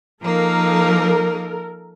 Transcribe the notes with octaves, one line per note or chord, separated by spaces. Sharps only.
F3 A#3 D#4 A4 A#4